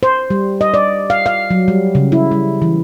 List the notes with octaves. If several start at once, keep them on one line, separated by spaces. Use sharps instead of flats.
C5
G3
D#5
D5
F5
F5
F#3
G3
C#3
E4
G3
E3